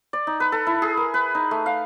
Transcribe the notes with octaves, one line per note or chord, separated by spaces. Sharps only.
D5
D#4
B4
A4
E4
G#4
A#4
B4
D#4
A3
F5